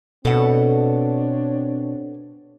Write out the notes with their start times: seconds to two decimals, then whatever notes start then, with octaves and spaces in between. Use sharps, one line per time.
0.25 B2 C4 D4 A4 C#5 F#5